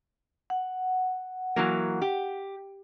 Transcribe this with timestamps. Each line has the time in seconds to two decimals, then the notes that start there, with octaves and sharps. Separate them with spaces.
0.50 F#5
1.56 E3 F#3 A#3
2.02 G4